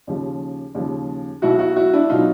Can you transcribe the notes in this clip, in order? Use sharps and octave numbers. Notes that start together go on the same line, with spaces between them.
D#2 C#3 F3
D#2 C#3 F3
B1 B2 F#3 E4 F#4
E4 F#4
E4 F#4
D4 E4
B2 F#3 D#4 F4